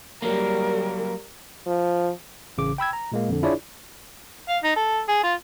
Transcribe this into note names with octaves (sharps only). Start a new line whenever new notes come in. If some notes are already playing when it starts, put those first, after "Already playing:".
F#3 G3 A#3 A#4
F3
A1 C#3 D6
G5 B5 E6 G#6
A#5
A#2 G#3 A#3
F2 D3
D4 E4 F4 G#4 C#5 D5
F5
D#4
A4
G#4
F4